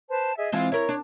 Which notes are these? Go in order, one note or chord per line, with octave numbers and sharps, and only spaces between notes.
B4 C5 A5
G#4 D#5 E5
E3 G#3 C4 F4 F5
E4 A#4 C#5
D4